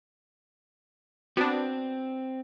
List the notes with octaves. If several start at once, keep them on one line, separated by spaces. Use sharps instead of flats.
B3 C4 D4 F#4